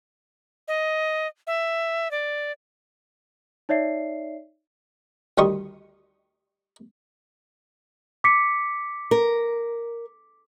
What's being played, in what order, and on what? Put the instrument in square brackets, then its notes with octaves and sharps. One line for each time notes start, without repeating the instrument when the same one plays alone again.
[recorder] D#5
E5
D5
[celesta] D#4 C#5 D5 E5 C7
[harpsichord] D2 D#3 G3 C6 C#6 D#6
[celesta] D6 B6 C#7
[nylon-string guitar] A#4